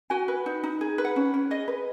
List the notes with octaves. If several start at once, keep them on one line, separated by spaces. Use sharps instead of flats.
F#4 G#5
B4
D#4
D#4
G#4
B4
F#5
C#4
C#4
G#4 D#5
B4